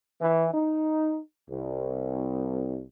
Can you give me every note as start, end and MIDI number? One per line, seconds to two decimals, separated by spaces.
0.21 0.49 52
0.54 1.18 63
1.50 2.84 36